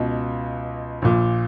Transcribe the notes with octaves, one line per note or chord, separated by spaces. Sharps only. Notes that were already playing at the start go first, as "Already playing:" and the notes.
Already playing: C#2 B2
A#1 A#2